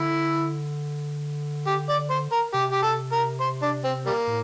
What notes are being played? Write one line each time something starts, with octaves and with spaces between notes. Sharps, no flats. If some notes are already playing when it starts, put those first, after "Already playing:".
Already playing: D3 E4
G4
D5
C5
A#4
C3 G4
G4
A4
A#4
C5
D4
C4
G3 A#3
A2